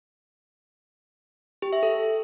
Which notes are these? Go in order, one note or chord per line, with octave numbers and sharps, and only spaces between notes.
G4
E5
A4